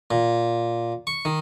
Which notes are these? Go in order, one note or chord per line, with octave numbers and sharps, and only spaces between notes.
A#2
C#6
D#3